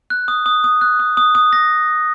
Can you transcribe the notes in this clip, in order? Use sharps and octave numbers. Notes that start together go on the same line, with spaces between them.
F#6
D#6
D#6
D#6
F#6
D#6
D#6
D#6
A#6